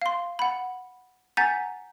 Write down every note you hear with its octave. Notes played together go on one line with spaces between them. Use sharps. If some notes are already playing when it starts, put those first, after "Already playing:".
F5 C6
F#5 B5
F#5 G#5 A#5 G6 A6 B6